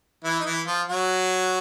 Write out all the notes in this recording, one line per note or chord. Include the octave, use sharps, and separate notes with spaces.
E3 E4
D#4
E3 E4
F3 F4
F#3 F#4